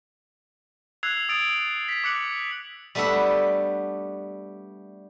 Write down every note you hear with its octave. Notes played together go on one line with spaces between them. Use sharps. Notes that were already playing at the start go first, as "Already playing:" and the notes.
E6 F#6 G#6 C7 F7
D#6 E6 A6 D7
B6
D6 F#6 C#7 F#7
G3 A3 B3 D4 E5 F#5